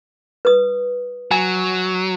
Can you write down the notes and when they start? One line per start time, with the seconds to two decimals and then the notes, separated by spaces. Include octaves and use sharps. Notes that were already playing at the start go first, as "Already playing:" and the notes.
0.45 B4 D#6
1.31 F#3 G#5